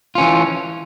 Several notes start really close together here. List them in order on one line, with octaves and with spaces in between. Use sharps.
F4 C#4 E3